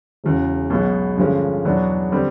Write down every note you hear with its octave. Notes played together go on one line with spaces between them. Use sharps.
E1 E2 C#3
B1 B2 G#3 B3
G2 D3 F3 G#3 C#4
E2 B2 F#3 B3 D4
D3 G3 C4